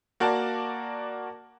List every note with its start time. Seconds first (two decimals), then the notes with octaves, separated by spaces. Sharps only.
0.20 A#3 F#4 A#4 D5 A5